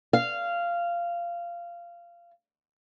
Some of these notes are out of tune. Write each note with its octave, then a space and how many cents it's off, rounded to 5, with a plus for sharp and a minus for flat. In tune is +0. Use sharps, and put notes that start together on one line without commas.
F5 -15